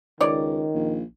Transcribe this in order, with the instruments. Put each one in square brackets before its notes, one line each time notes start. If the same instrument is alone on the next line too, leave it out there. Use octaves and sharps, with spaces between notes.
[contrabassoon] C#2 [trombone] D#3 [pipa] C#5 D5
[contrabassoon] A#1